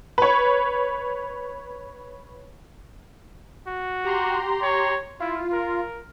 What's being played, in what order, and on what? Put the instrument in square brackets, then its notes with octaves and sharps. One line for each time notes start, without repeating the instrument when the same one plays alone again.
[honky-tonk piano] B4 C#5
[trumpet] F#4
[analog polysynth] G4 A#5 C6
[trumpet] C#5
[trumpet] E4 [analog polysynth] F4
[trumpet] A#4